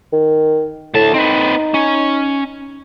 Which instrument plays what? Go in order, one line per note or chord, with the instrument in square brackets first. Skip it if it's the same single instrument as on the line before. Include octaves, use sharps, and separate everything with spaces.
[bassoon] D#3
[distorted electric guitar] D2 A5 [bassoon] A2
[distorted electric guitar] C4 B4 [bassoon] D#4
[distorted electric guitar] C#4